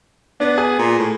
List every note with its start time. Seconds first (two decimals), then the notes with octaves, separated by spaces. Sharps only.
0.40 B3 D4
0.58 G#4 G#5
0.79 A#2
0.98 A2